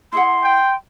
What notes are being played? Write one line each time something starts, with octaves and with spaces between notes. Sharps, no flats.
E4 G#4 F#5 C6
G5